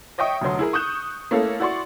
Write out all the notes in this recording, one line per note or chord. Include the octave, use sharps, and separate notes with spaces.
C#5 D#5 E5 G5 C#6 D#6
F1 D2 F#3 C6
E4 G#4 A#4
C#6 D#6 F#6 G6 E7
A3 A#3 C#4 E4 A4 F5
E4 F#4 D5 C6 C#6